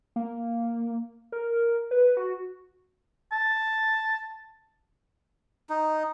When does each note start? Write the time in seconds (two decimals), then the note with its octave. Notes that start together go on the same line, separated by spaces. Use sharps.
0.16 A#3
1.32 A#4
1.91 B4
2.17 F#4
3.32 A5
5.70 D#4